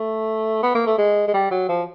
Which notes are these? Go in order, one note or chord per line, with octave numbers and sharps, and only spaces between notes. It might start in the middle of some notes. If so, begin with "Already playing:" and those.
Already playing: A3
B3
A#3
A3
G#3
G#3
G3
F#3
F3